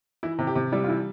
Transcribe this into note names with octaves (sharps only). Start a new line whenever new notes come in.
E3 E4
C3
G4
C3
G3 E4
F4
E3 E4